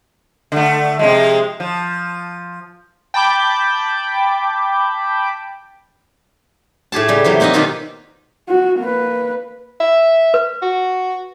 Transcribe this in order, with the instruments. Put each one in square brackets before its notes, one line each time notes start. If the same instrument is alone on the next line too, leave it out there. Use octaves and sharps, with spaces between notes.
[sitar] D3 A3
C3 F3 G#3
F3
[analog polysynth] G5 A5 B5 D6 G6
[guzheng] A2 G4 G#4 A5
C#3 G3
C3 E3 F#3
A#3 C4 D#4 B4 D#5
B2 D#3 D#4 F4 G4
[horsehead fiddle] F#4
A#3 B4
[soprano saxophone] E5
[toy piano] B4
[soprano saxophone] F#4